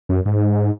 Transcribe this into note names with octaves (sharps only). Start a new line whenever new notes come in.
F#2
G#2